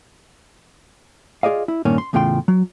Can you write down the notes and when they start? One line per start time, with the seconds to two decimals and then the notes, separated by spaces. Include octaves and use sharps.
1.43 F4 G#4 D5 D#5 F5
1.68 E4
1.85 G2 A#2 D#3 A#3 C#4
1.98 C6
2.13 E2 A2 C#3 F4 G5 C6
2.48 F#3